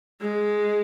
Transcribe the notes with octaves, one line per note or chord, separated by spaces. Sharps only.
G#3